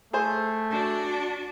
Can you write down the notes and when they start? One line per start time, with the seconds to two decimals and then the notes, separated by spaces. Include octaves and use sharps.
0.13 A3 G#4 C5
0.71 D4 F#4